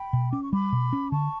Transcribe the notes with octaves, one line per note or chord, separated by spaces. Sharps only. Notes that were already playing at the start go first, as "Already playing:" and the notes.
Already playing: G5 B5
B2
C#4 D6
C#6
G3 B5 D6
B2
C#4
D3 A5 C#6